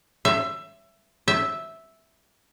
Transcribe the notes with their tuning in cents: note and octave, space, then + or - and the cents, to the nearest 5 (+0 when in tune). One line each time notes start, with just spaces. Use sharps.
E5 +20
E5 -5